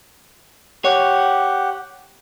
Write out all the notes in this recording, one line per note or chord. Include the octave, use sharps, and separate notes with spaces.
G4 C#5 F#5